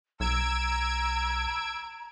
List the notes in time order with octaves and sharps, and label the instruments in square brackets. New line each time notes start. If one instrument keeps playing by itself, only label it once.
[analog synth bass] B1 [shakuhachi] A#5 [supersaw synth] E6 G#6 D7